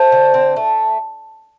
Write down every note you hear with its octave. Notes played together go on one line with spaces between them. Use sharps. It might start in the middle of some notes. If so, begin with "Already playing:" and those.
Already playing: A3 C5
D3
C4
A3